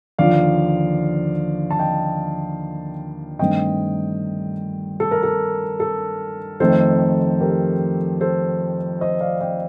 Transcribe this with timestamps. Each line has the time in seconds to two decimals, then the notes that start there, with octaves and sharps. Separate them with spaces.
0.19 D#2 D3 F3 D5 F5
1.71 A5
1.79 D#5 G5
3.39 G2 D#3 A3 C4 D#5 G5
5.00 A4
5.11 A#4
5.23 A4
5.80 A4
6.60 F2 D#3 A3 C4 A4 C5
7.41 G4 A#4
8.21 A4 C5
9.01 C5 D#5
9.21 D5 F5
9.41 D#5 G5